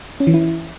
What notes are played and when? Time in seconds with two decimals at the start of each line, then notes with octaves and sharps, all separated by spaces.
0.20 C#4
0.27 E3
0.34 E4